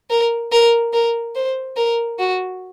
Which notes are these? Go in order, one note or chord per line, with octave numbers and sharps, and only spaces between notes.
A#4
A#4
A#4
C5
A#4
F#4